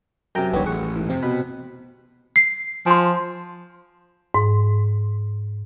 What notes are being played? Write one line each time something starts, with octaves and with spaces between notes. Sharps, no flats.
F#2 C3 G5 A#5 G6
D#1 A#1 G2 D#3 B3 G4 C#5
A1 G#4 F#5 C#6
G#2 E3
F2 C3 C4
B2 B5
C7
F3 G#5 C6
G#2